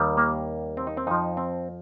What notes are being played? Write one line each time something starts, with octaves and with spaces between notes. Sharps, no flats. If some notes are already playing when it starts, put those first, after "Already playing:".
Already playing: D#2 D#3 G3
A#3
C4
D#4
C4
F2 F3 D#4
C4